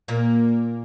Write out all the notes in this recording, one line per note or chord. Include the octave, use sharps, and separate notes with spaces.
A#2 A#3